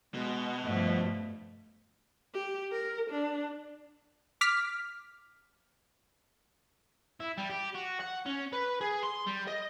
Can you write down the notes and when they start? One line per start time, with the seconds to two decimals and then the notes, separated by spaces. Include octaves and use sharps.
0.14 B2 G#3
0.63 G2 F3 A3
2.34 G4
2.72 A#4
3.10 D4
4.41 D6 F6 B6
7.20 E4
7.37 G3
7.49 G4
7.75 F#4
8.00 F#5
8.26 C#4
8.53 B4
8.81 G#4
9.03 C6
9.26 G3
9.47 D#5